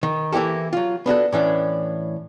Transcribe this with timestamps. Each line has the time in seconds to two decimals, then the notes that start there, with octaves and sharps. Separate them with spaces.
0.03 D#3
0.32 E3 A#3 E4 G4 A4
0.73 F#3 F4
1.06 B3 D4 F#4 A4
1.32 A2 E3 C#4 D4